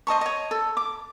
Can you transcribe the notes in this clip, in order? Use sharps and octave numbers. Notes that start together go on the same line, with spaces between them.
C5 D#5 A5 C#6
C#5 D#5
A4
D6